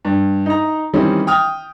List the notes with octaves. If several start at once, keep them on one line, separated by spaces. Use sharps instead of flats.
G2
D#4 A#5
D#3 E3 G3 C4 C#4
G5 D#6 F6